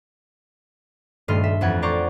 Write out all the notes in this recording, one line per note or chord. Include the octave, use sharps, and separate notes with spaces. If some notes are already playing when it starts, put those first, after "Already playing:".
D#1 G2 A3 D#5 C6 F6
E5
A1 F2 F#5 G#6
C5 D5 A#5 C#6 D6